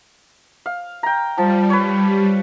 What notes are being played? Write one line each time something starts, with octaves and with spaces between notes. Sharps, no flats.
F5
G5 A#5
F3 G3 A5
B4 C#5